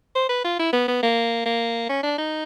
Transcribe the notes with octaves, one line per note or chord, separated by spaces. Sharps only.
C5
B4
F4
E4
B3
B3
A#3
A#3
C#4
D4
D#4